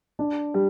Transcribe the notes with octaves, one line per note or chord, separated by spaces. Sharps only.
D4
G3